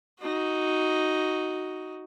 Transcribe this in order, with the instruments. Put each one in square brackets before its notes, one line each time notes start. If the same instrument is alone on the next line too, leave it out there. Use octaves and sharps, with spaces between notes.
[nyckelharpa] D#4 F#4